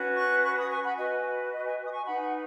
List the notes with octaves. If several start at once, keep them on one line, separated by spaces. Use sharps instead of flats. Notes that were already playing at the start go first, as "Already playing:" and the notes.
Already playing: C#4 F#4 B4
C#6 F#6
C#6 F#6
B5 D#6
G#5 C#6
F#5 B5
F#4 B4 D#5 G#5
D#5
D#5 G#5
D#6
G#5 C#6
D#4 B4 F#5 B5
F#5